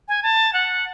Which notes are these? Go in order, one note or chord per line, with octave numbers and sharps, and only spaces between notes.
G#5
A5
F#5